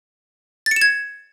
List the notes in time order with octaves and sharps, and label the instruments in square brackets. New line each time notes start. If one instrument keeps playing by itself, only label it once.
[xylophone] A6
C#7
E7
G#6